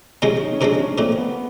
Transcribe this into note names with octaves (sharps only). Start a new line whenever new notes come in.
C3 F3 G#3 C4 C#4
D#4
C#4
C3 F3 G#3 C4 D4
C#4
A#2 F3 A3 C4
B3